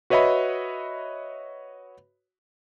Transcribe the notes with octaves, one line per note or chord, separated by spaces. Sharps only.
F#4 B4 C#5 D#5 E5 B5